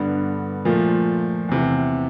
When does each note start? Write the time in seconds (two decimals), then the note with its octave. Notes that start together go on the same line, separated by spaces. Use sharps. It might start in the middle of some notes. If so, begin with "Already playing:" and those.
Already playing: G2 D3 G3 B3
0.65 A#2 F3 A3
1.49 E2 C3 E3